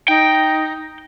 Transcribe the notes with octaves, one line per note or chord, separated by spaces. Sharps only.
D#4 G5